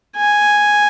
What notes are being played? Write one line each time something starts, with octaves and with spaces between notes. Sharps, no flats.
G#5